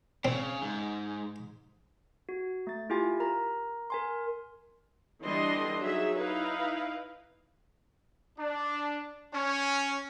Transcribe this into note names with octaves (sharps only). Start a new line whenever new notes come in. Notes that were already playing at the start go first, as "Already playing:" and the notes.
C#3 C4
G#2
F#4
A3 A6
E4 F4 G4 G#5
A#4 A#5
A#4 G#5 C6
D3 E3 G3 D4 D#5 C6
F#3 D#4 G#4 E5
D#4 E4 B4 F5
D4
C#4